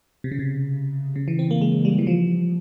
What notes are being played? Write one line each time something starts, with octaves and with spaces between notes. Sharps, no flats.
C3
C#3
C3
C#3
E3
C4
A#3
G#3
G3
E3
F3